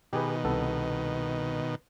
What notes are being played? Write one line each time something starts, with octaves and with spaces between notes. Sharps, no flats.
B2 D#3 G4 G#4 B4
C2 B3 A4